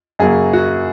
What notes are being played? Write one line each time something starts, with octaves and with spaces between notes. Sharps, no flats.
F#2 C#3 F#3 A#3 G#4
F#4